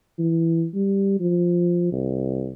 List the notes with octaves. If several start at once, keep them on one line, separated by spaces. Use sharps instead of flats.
E3
G3
F3
C2